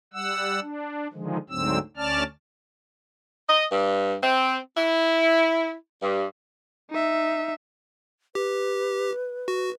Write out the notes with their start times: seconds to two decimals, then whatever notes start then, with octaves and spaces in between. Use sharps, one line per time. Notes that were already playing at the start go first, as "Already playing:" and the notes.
0.13 G3 F#5 E6
0.61 D4
1.13 D3 D#3 F3 G#3
1.50 D2 G#2 D3 F#3 C4 E6
1.97 D2 C#4 D5 A5 F6
3.49 D#5
3.72 G2
4.23 C4
4.77 E4
6.02 G2
6.91 D#4 E5
8.35 G4 B4
9.48 F#4